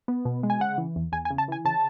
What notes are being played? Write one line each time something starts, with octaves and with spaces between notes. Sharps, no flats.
B3
B2
G#3
G#5
C#3 F#5
E3
E2
E2 G#5
G#5
C#3
A5
E3 G#5
C#3 A5